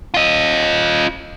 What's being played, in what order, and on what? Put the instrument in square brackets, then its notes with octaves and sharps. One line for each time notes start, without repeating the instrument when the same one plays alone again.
[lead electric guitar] F4 D#5